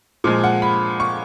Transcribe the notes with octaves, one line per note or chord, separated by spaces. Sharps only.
A#2 F3 G#3
F#5
B5
C#6